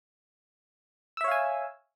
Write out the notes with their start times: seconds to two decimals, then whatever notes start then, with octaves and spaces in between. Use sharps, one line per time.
1.17 E6
1.21 E5
1.24 C#5
1.28 F5
1.31 G#5